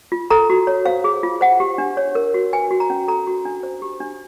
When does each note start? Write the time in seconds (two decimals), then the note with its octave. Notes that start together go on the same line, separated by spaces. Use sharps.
0.12 F4
0.30 A4 A#5
0.50 F#4
0.67 C#5
0.86 C5 F5
1.04 G#4
1.23 F4
1.41 C5 F#5
1.60 G4
1.78 D4
1.97 C#5
2.15 A#4
2.34 F#4
2.53 B4 G#5
2.71 F#4
2.80 A#5
2.90 C#4
3.08 A4 A#5
3.27 F#4
3.45 D4
3.63 C5
3.82 G4
4.00 D4